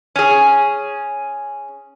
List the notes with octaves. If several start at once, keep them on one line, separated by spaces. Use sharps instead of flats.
C#4 G#4